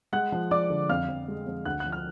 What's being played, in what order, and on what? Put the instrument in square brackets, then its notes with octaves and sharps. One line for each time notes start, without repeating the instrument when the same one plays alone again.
[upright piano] G#3 F#5 F#6
F3
F3 D5 D6
D3
F2 F5 F6
F2
G#3
F2
D2 F#5 F#6
F#6
F3
F6